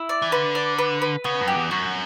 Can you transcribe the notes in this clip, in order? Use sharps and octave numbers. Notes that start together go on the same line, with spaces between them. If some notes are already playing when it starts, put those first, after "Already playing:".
Already playing: E4
D5
E3
D3 B4
D5
B4
B4
C#3 B3
F#2
G4
E2
F#2 F#4